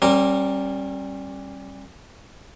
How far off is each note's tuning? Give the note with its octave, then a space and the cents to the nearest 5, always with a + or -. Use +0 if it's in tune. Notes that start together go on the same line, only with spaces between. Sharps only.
G3 -10 C#4 -40 A#4 -10